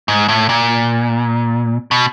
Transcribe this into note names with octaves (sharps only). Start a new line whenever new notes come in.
G#2
A2
A#2
B2